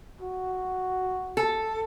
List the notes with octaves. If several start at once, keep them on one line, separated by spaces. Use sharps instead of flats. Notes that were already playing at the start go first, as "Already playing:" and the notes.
F#4
A4